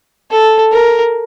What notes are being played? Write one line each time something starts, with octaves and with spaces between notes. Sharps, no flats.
A4
A#4